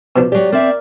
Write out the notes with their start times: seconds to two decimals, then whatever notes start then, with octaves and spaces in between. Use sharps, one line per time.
0.16 B2 F3 D4
0.32 F#3 G4 D5
0.53 C4 A#4 D5 E5